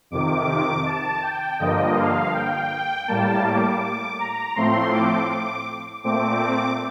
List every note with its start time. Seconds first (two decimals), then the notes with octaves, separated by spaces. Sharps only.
0.11 F2 C3 D#3 D6
0.85 A5
1.22 G5
1.59 G2 D3 F3 A#3 D#5
1.96 F5
2.34 G5
3.08 A2 G3 A#3 A5
3.45 D6
4.19 A#5
4.55 A2 F3 A3 C4 C6
4.92 D6
5.30 D6
6.04 A#2 A3 C4 D6